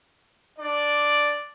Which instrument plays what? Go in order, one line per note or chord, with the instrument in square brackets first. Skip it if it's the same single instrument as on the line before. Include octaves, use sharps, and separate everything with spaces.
[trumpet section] D4 D5